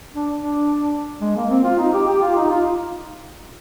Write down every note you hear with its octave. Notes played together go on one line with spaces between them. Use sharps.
D4
D4
G#3
A#3
C4
F4
D#4
G4
G4
F4
D#4
F4